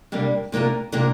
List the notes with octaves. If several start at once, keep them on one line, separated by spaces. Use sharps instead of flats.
C3 G3 A#3 D4
C3 A#3 D4 F4 A#4
C3 A#3 D4 F4 A#4